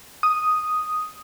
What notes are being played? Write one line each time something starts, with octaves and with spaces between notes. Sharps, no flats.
D#6